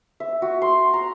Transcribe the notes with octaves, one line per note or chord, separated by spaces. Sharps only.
E5
F#4
C6
A#5